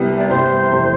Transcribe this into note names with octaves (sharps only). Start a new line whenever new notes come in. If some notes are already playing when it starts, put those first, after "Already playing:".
Already playing: C2 C3 G3 B3
D5
C2 C3 G3 B3 C5
F1 E2 C3